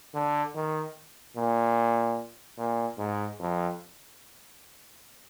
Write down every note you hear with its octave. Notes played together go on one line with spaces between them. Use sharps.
D3
D#3
A#2
A#2
G#2
F2